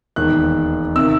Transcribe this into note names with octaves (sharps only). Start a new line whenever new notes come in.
E1 D#2 D#3 F#6
C3 D#3 E6